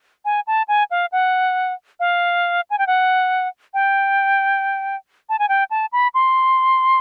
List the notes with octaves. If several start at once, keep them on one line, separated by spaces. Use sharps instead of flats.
G#5
A5
G#5
F5
F#5
F5
G#5
G5
F#5
G5
A5
G#5
G5
A5
B5
C6